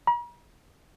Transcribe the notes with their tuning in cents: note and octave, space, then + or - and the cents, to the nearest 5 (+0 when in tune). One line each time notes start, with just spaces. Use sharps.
A#5 +45